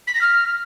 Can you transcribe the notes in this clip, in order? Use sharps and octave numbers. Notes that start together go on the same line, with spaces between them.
B6
A#6
F6